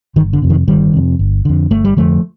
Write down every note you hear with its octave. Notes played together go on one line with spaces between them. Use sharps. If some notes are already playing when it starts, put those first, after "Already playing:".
G1 D#3
D3
F2 C3
D#3
G1 D#3 G3
F2 C3
G1
F2 D3
G1 A3
G3
F2 D3 F3 A3